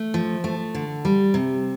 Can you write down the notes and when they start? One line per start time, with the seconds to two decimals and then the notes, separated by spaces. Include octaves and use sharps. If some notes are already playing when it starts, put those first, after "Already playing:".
Already playing: A3
0.14 F3
0.44 A3
0.75 D3
1.05 G3
1.34 C3